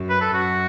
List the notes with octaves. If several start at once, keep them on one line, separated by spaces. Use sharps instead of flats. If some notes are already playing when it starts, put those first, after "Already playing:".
Already playing: F#2
B4
A4
F#2 F#4